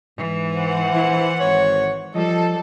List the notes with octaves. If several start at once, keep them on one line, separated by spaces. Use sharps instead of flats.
G#2 E3
C5 F#5
A#1 E4
G#1 C#5
F3 G3 A4 D#5